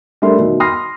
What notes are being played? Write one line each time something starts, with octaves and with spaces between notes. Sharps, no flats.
G3 A3 D4 A#4 E5 C6
B2 D#3
B5 C6 D#6 F6 A#6 C7